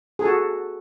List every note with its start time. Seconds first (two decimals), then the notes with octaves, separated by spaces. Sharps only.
0.19 G#4
0.22 A4
0.25 F#4